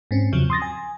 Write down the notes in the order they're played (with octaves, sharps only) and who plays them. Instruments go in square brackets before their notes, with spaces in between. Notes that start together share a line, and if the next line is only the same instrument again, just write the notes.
[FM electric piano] G#2 C4 C#4
E2 C#3 F3 F#3
C6 D#6 A6 A#6
G#5